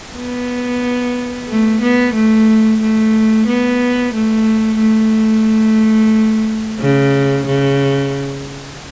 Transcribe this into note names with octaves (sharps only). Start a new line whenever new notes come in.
B3
A3
B3
A3
A3
B3
A3
A3
C#3
C#3